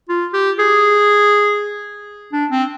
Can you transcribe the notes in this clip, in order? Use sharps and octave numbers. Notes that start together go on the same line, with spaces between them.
F4
G4
G#4
D4
C4